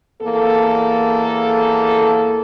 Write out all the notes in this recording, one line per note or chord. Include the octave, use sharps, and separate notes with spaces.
E2 A#3 A4